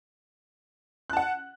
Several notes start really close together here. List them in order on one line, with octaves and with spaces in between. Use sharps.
F#6 A5 F#5